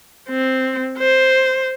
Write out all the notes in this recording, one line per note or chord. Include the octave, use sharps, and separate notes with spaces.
C4
C5